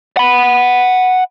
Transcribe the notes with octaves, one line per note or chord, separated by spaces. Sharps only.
F#5 B5